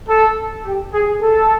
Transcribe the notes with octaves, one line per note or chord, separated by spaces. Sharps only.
A4
G4
G#4
A4